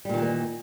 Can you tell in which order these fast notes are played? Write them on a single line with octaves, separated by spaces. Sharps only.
G3 A#2 D#3 E3 A#3